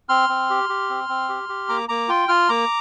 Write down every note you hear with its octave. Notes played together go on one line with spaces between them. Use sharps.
C4 C6 F6
C4
G4
G4
C4
C4
G4
G4
A#3 A#5 D6
A#3 A#5 D6
F4 G5 C6
F4 C6 F6
A#3 A#5 D6